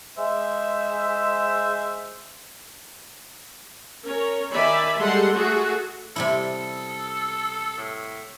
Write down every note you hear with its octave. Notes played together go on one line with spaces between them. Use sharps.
G#3 C5 E5
C#4 A#4 C#5
D#3 D5 E5 G#5 B5
G3 G#3 A4 F#5 C6
A3 F#4 G#4 A4
C3 G3 E4 A4
A2